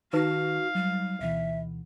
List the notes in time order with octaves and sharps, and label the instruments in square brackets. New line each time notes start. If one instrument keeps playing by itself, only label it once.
[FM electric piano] D#3 A5 [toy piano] D#4 B4 [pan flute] F#4 [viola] F5
[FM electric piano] F#3 [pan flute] G3
[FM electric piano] D2 B2 E3 [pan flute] E5